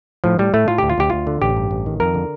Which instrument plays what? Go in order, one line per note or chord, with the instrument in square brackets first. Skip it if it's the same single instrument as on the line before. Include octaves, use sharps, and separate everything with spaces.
[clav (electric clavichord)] A2 F3
A2 G3
A2 A3
A2 F4
D2 G4
F4
D2 G4
D2 F4
D3
A1 G4
G2
A1
D#3
F2 A#4
D3